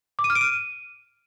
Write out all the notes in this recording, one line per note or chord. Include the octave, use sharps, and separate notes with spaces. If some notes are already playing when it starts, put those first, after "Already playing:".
D6
D#7
F6
D7
D#7